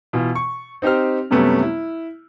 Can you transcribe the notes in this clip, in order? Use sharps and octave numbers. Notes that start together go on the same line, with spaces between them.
B2 E3 F4
C#6
C4 D#4 G4 C5 F6
F#2 C3 G3 A3 B3 C#4
E4